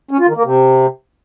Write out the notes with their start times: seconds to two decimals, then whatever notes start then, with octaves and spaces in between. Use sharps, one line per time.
0.11 C#4
0.19 F4
0.28 D#3
0.36 A#3
0.44 C3